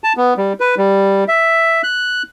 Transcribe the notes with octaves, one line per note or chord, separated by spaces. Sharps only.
A5
B3
G3
B4
G3
E5
F#6